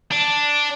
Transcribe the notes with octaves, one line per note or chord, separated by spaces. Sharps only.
D4